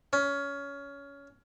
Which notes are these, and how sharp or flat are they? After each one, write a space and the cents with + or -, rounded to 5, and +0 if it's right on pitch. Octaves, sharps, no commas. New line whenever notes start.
C#4 +20